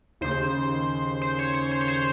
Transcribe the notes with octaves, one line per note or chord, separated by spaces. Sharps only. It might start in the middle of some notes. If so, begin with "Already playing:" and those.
D#2 C#3 C5
C5
C#5
C#5
C5
C#5
C5